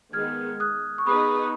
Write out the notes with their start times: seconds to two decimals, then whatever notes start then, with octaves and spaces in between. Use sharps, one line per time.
0.13 D#3 G#3 B3 F6 G#6
0.60 D#6 F#6
0.98 C#6
1.06 B3 D#4 G#4 B4 B5 D#6